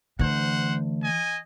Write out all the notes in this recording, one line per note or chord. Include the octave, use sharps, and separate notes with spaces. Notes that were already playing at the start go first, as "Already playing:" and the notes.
D2 E3 C5 F#5
D#5 G#5